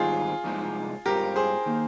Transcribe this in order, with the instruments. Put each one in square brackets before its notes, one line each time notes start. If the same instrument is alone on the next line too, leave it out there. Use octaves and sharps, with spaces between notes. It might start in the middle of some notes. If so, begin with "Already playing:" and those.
Already playing: [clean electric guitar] G#2 D#3 G3 C4 D#4 [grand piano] F4 G#4
[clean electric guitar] C2 C3 F3 G#3 D#4
[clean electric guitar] G#2 G3 C4 F4 [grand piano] G4 A#4
[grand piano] G#4 C5
[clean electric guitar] D#3 A#3